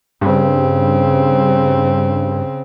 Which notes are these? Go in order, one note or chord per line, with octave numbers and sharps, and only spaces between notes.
G2 C#3 C4